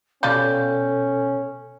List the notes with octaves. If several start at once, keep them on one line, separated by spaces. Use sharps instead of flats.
B2 C#4 F4 G4 A4 D5 G6